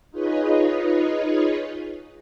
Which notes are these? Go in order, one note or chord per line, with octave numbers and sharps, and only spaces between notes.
D#4 F4 G#4 B4 C#5 D#5